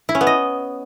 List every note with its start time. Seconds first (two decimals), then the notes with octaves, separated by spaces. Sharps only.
0.09 E4
0.15 C#4
0.21 B3
0.27 D#5